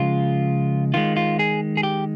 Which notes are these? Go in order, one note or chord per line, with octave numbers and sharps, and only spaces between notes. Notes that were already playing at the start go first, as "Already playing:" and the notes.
Already playing: C#3 F3 G#3 F4
D#3 G#3 F4
F4
G#4
G#4
G4